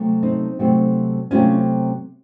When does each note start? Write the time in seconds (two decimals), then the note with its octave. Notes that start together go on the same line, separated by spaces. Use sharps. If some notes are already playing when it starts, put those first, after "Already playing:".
Already playing: C3 F#3 A3
0.23 C4 D#4
0.59 C3 F#3 A3 C4
1.31 C3 F#3 A3 C4 C#4 F4